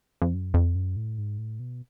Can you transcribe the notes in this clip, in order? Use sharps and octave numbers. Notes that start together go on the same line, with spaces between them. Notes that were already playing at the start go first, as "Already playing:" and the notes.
F2
F#2
F2
F#2
A2
G#2
A2
B2